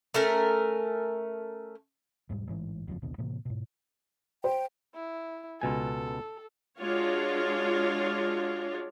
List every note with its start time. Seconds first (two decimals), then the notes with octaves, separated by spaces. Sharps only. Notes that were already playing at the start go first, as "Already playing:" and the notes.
0.14 A3 C#4 A#4
2.29 E1 G#2 G3
2.47 A1 G#2 E3
2.88 F#1 F2 G#2 F3
3.02 A#1 D#2 B2 D3
3.18 A2 C3 E3 A#3
3.45 G#2 B2
4.44 C5 G5
4.95 E4
5.61 C#2 B2 A4 G#5
6.78 G#3 D4 F4 F#4 C#5